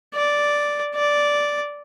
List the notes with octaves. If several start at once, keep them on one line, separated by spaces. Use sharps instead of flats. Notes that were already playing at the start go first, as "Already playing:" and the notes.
D5
D5